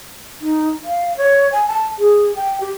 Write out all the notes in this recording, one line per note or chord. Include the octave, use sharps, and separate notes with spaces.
D#4
F5
C#5
G#5
A5
G#4
G5
G4